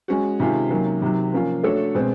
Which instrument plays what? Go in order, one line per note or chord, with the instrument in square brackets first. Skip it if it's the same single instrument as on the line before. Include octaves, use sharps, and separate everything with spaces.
[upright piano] G#3 C#4 F#4
C3 D#3 G#3 C#4 F4
C3 D#3 F#3 A#3 C#4
C3 D#3 F#3
F3 A#3 C#4 F4
A3 D4 F#4 A4 C#5
B2 G#3 C4